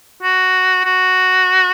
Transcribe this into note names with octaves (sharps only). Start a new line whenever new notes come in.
F#4
F#4